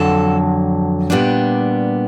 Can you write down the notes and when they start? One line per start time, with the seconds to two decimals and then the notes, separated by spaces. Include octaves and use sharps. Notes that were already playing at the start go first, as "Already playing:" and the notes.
Already playing: F2 D3 F#3 A4
1.10 A#2 G3 B3 D4